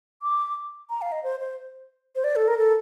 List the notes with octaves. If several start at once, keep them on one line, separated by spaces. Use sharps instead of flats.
D6
A#5
F5
D#5
C5
C5
C5
D5
A4
A#4
A4